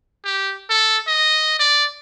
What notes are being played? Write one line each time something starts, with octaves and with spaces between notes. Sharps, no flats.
G4
A4
D#5
D5